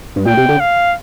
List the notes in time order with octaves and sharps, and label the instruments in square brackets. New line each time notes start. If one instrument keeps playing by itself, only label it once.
[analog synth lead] G2
[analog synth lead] A#2 [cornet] G5
[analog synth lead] C3
D3
[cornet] F5